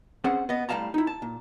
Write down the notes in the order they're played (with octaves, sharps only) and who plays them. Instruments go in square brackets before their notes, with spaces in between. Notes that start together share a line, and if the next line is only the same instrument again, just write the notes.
[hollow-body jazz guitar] C4 C#4 G#4 C5 F#5
B3 D#5
A2 G3 F5 A5 A#5
D#4 E4
A5
A#2